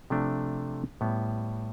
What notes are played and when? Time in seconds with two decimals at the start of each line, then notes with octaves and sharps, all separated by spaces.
0.10 C3 F3 A3 D4
1.01 A2 G3 B3